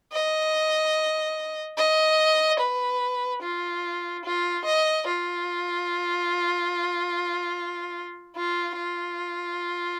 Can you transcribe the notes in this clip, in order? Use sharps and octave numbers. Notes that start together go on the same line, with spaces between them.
D#5
D#5
B4
F4
F4
D#5
F4
F4
F4